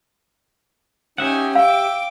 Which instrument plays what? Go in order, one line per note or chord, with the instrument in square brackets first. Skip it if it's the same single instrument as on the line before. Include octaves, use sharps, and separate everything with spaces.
[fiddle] C#4 G#5 [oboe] D#4 [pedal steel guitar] G4 E5 F#5
[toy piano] F5 [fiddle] G5 D6 [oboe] E6